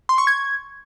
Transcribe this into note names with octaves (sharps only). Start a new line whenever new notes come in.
C6
C#6
G#6